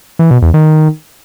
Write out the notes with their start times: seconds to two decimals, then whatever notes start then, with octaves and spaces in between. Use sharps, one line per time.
0.19 E3
0.31 B2
0.42 E2
0.54 D#3